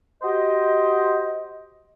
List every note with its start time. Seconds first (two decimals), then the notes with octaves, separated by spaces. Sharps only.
0.22 F#4 G4 C5 D#5